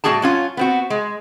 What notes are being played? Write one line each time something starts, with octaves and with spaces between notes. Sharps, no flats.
A2 G3 C4 F#4 G#4 A5
F#3 C#4 F4
B3 C4 F#4
G#3